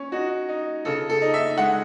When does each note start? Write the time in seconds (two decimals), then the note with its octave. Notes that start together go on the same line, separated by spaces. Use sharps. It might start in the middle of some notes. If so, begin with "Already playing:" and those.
Already playing: C#4
0.12 D#4 F#4
0.49 D#4
0.85 C#3 A4
1.10 A4
1.22 D#4
1.34 E5
1.58 G#3 F#5